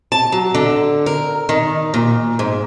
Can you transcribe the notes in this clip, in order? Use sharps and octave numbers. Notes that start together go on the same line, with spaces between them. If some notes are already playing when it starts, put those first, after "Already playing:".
A5
F#3
D3
A#4
D#3
A#2
G#2